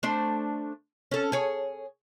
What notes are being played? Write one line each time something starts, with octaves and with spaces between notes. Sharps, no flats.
A3 D4 C5
C#4 A4
G#4 C#5